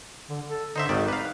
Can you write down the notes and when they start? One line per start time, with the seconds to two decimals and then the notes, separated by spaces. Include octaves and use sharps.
0.30 D3
0.47 A4
0.76 D3 D#4 C5 E5
0.89 G#1 D#3 D#4 D5
1.08 B4 F5